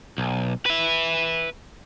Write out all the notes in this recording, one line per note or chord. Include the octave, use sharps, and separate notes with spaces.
B1
B4 E5